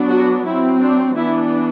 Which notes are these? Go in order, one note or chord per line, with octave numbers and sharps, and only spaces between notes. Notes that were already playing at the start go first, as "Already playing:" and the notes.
Already playing: F#3 B3 D4
F#4
F#3 C4 E4
D4
E3 B3 D4 E4